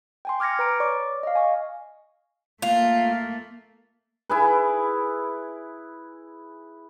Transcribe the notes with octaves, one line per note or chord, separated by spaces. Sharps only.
G5 G#5 C6
D6 F6 G#6 A#6 C#7
B4 A#5 D7
C#5 D5 C#6 D6
D#5 F5
G#5 C#6
A3 A#3 F4
E4 G#4 B4